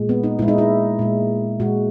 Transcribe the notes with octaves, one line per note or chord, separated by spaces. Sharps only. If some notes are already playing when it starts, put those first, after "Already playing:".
Already playing: A#2 G#3
B3
D#4
A#2 G#3 E4
D#4
E4
A#2 G#3
A#2 G#3 F#4